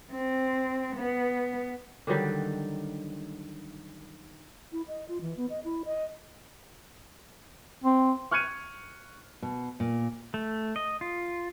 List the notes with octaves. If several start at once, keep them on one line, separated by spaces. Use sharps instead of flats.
C4
B3
D3 D#3 F#3 G3
E4
D#5
F4
E3
B3
D#5
E4
D#5
C4
C#6 F6 F#6 G#6 C#7 D#7
B2
A#2
A3
D#5
F4